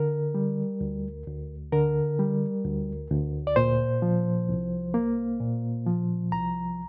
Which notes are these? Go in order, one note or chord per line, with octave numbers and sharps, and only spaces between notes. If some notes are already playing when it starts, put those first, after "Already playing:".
Already playing: D3 A#4
G3
D2
D2
D3 A#4
G3
D2
D2
D5
A#2 C5
F3
C2
A#3
A#2
F3
C2 A#5